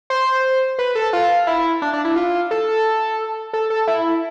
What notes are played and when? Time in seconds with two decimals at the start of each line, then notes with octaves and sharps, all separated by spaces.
0.10 C5
0.79 B4
0.95 A4
1.13 F4
1.47 E4
1.82 D4
1.93 D4
2.05 E4
2.16 F4
2.51 A4
3.53 A4
3.70 A4
3.88 E4